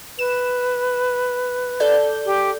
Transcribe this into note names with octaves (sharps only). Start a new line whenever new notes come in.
B4 E7
A4 D5 G6
G4